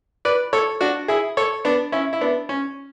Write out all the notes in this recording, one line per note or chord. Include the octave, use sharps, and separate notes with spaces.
B4 D5
A4 C#5
D4 F#4
E4 G#4
A4 C#5
B3 D4
C#4 E4
E4
B3 D4
C#4